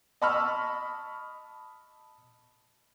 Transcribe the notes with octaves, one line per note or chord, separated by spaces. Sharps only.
D#5 A5 B5 C#6 E6 F6